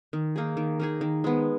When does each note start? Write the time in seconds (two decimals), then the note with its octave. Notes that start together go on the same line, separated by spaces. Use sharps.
0.13 D#3
0.36 A#3 D#4 G#4
0.57 D#3
0.80 A#3 D#4 G#4
1.01 D#3
1.24 G#3 B3